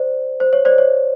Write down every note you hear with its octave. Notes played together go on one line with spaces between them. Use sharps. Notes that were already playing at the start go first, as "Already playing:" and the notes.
Already playing: C5 D5
C5
C#5
C5 D5
C#5